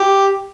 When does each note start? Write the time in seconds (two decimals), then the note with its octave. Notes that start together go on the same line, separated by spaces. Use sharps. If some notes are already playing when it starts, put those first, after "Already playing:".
Already playing: G4